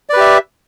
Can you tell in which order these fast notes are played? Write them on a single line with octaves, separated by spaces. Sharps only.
D5 B4 G4 E5